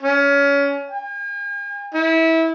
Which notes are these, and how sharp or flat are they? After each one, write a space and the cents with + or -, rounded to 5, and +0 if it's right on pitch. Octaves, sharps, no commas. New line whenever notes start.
C#4 +25
G#5 -45
E4 -25